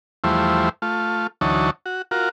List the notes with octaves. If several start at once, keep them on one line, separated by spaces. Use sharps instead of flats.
E2 F3 G3 A3 E4 C5
A3 F4
D2 E3 F#3 D#4 C#5 A5
F#4
F4 F#4 A#4